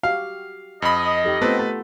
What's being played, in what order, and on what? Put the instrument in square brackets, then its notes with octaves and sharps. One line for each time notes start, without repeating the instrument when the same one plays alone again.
[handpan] F#4 G4 [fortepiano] F5
[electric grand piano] F2 B5 [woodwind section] D#5
[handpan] D#4 G4 A4
[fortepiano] A3 C4 [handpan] B3 F4 [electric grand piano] B4
[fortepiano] A3